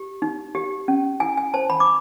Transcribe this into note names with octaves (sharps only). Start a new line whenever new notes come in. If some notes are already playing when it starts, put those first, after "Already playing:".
Already playing: G4
D#4
G4
C#4
E4 G#5
G#5
C5 A5
B5
D6